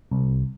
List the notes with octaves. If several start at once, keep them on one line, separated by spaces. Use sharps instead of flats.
C2